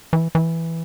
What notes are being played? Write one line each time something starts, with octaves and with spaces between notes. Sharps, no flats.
E3
E3